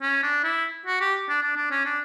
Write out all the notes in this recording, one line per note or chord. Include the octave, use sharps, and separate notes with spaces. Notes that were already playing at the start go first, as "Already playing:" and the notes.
C#4
D4
E4
F#4
G4
D4
D4
D4
C#4
D4